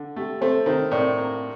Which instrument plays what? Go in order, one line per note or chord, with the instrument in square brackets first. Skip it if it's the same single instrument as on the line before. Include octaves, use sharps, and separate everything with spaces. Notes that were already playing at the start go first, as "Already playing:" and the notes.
Already playing: [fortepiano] D3
[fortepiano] A3 [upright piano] G4
[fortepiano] A3 [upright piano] A4 C5
[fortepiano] D#3 [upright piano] A4 C5
[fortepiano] A2 [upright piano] A#4 D5
[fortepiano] A#3